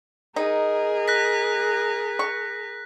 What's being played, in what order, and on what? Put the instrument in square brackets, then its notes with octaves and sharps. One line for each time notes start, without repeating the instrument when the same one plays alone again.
[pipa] D#4 [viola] G#4 A#4
[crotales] F#6 A#6 B6
[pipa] C#6